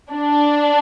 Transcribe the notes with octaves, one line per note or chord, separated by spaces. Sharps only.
D4